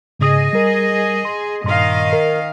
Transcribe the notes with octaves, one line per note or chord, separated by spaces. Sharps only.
G#2 C#3 G#4 D#5 D#6
G3 A#4
C6
G2 A#2 D#3 D#5 F5 C6
A#4